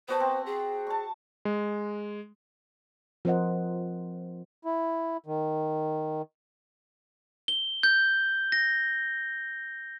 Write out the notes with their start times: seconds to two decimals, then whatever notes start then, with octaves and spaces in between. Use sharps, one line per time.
0.08 B3 F#4 C5 A5
0.20 C4
0.46 G#4
0.87 A5 C#6
1.45 G#3
3.25 F3 C4 A#4 C5 D#5 F#5
4.65 E4
5.26 D#3
7.48 G7
7.83 G6
8.52 A#6